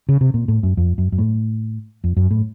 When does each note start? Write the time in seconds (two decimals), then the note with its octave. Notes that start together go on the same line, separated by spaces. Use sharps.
0.09 C#3
0.21 C3
0.34 A#2
0.48 A2
0.63 F#2
0.77 F2
0.98 F#2
1.12 F#2
1.18 A2
2.04 F2
2.17 F#2
2.31 A2